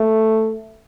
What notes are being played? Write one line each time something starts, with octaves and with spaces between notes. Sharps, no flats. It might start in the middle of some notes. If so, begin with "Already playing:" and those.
Already playing: A3